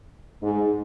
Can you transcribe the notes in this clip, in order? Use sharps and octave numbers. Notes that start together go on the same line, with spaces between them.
G#2